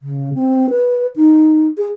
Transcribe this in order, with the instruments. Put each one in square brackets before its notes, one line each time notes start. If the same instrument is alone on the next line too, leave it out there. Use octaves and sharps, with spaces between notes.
[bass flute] C#3
C4
B4
D#4
G#4